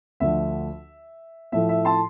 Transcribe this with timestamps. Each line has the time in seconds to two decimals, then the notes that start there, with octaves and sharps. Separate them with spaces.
0.20 D2 D3 F3 E5
1.52 A2 F3 A3 E5
1.69 E5
1.85 A5 C6